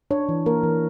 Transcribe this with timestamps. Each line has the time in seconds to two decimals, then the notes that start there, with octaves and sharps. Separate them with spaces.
0.11 D4 C#5
0.29 E3
0.46 A#3 A#4
0.63 E3